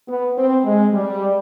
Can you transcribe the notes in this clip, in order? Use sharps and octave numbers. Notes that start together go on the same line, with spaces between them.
B3
C4
G#3
G3